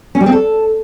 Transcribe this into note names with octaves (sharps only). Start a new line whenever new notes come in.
C#4
G3
C4
A4